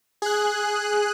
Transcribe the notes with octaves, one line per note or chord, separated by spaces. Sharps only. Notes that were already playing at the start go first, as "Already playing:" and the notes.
G#4 F#6